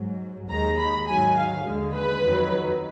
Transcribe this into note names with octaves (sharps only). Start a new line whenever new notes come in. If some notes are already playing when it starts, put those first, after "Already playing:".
Already playing: G#2 F#3
D#2 D#3 G#3 A#5
B5
G#2 D#3 F#3 G#5
F5
D#2 D3 G#3
B4
F2 D#3 F#3